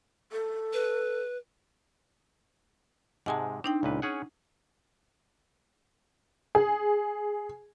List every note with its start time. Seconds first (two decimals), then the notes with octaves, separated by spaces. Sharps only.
0.32 A4
0.73 B4
3.26 G#2 C3 G#3 F#5 G#5 A5
3.64 C4 D4 D#4 G5
3.83 C#2 A#2 B4
4.02 C#4 G#4 F#5
6.55 G#4